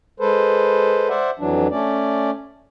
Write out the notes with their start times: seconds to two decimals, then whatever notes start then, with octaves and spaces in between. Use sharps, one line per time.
0.20 G#3 A4 B4 C5
1.09 C5 D5 E5 F#5
1.39 F2 E3 F#3 D4
1.71 A3 C#4 D5